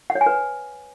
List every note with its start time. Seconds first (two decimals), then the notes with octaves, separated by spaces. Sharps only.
0.10 F#5
0.15 C#5
0.21 G#5
0.26 B4